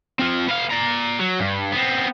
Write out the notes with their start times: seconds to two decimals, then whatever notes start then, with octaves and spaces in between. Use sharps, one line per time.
0.19 C4 F4
0.48 B3 F5
0.71 D5 A#5
1.20 F#3
1.40 G2
1.72 B3 C4